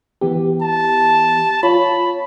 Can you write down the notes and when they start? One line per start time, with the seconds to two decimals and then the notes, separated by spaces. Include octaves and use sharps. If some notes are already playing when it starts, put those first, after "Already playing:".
0.21 E3 B3 G4
0.62 A5
1.63 F4 C#5 B5